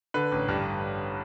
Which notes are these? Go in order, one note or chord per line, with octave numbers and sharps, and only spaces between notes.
D3 B4
A1
G2